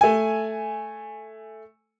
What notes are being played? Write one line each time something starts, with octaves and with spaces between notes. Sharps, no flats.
A3 G#5